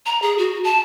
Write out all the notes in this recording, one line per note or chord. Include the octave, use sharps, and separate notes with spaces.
A#5
G#4
F#4
A5